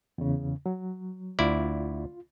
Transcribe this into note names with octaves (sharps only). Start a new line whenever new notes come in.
E2 C#3
F#3
D2 E4 F4 D5